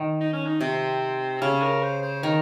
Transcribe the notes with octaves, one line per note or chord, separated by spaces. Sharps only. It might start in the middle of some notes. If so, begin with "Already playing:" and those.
Already playing: D#3
D#4
C#4
D#4
C3 C4
C#3 C#4
A#4
C5
C5
D#3 A#4